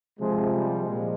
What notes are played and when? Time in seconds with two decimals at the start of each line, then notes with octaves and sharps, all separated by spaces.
0.18 C3 F3 G#3
0.50 G3
0.82 A#2 F3 G#3